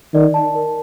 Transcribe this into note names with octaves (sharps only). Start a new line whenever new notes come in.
D#3 D5
A5
A#4